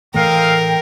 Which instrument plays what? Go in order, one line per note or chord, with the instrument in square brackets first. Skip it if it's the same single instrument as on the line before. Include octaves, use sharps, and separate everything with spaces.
[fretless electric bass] A2 E3 A3 [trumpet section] C4 D#5 F5 [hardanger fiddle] A#4 [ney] G5